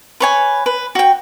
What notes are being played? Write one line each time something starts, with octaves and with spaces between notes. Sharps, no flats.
B4 C#5 G#5
B4
F#4 G5